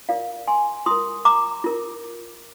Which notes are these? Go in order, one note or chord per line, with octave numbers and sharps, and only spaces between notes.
F4 A#4 D5 F5
G#5 C6
F4 A#4 C6 D#6
A#5 D6
F4 A#4